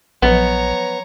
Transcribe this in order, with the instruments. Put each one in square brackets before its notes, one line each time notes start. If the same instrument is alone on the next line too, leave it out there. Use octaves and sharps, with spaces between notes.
[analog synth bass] A#1 [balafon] F3 F#3 B4 [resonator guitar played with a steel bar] B3 [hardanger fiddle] C#5 A#5